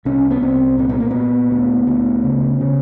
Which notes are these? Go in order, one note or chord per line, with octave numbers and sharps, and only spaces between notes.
C2 C#4
B3
C2 C4
A#2 C4
B3
A#3
A#2 B3
D2
D2
C#3
C#3